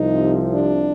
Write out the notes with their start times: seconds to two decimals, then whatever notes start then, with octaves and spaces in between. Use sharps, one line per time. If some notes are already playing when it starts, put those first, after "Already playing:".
Already playing: C2 C3 F3 D#4
0.54 D4